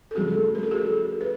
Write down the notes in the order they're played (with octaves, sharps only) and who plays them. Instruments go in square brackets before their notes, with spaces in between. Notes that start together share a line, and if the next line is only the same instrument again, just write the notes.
[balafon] A4
[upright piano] C#3 F3 A3 [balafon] F#4 G#4
[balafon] A#4
A4
F#4 G#4
B4